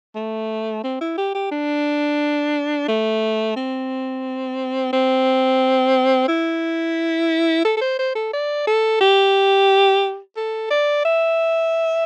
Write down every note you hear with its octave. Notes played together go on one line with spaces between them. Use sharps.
A3
C4
E4
G4
G4
D4
A3
C4
C4
E4
A4
A4
C5
C5
A4
D5
A4
G4
A4
D5
E5